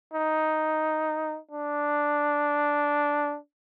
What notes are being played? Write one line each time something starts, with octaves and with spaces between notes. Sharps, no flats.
D#4
D4